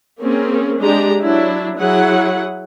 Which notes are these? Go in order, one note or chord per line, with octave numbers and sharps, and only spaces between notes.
A#3 C4 C#4 G#4
G#3 D4 G4 A#5
F#3 D4 E4
F#3 E4 G#4 F#5